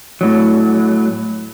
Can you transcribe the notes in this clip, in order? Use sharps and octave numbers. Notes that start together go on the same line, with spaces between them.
A2 F#3